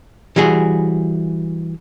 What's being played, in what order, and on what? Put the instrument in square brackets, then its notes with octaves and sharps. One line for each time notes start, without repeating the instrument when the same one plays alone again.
[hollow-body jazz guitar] E3 G3 F#4 G#4